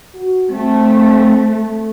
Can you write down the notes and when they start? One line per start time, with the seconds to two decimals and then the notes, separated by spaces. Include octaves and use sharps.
0.14 F#4
0.51 A3 C4
1.48 A3